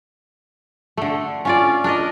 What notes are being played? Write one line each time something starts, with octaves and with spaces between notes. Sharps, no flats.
D3 A3
C#4 F4 D5
D4 A#4 D#5